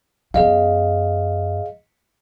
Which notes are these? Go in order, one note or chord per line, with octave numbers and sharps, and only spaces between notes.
F#2 B3 G#4 D#5 F5